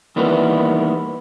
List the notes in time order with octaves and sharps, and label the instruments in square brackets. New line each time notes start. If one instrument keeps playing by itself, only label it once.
[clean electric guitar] D#3 E3 G3 A#3 B3 E4